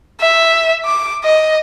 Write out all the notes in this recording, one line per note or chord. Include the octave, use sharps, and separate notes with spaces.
E5
D6
D#5